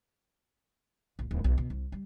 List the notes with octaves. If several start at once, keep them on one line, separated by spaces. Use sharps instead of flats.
A#1
D1
B1
B2
C2
G3